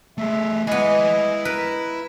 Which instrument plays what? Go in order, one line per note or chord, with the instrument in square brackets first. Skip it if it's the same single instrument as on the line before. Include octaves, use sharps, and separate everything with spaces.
[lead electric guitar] A3 G#4 [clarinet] E5
[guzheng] G#3 B3 [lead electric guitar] E4 G#5 [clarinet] D#5
[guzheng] A#4 B4